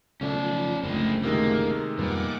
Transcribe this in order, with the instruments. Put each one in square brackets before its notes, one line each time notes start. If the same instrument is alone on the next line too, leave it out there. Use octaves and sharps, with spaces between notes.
[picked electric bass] B1 C#3 A3 [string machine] F3 [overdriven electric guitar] C#4 D5
[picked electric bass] F#1 C#2 D3 [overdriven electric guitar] G#3 C4 [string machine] A3
[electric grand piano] C3 D#3 G#3 [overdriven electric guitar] A#3
[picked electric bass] F2 G3 B3 [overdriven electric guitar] A#2 [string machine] F#5 D6